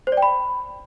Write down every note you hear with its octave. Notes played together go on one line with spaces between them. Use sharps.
C5
D5
G5
B5